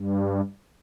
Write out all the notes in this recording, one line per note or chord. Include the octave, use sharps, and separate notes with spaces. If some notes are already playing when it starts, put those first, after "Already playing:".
Already playing: G2